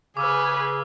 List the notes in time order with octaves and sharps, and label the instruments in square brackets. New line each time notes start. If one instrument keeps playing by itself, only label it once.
[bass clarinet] C#3 [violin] G#4 B4 [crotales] D6 E6 F6